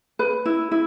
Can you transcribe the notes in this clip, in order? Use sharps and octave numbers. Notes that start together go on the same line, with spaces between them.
B4
E4
E4